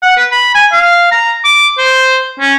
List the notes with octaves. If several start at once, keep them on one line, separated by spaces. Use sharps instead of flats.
F#5
B4
B5
G#5
F5
A#5
D6
C5
C#4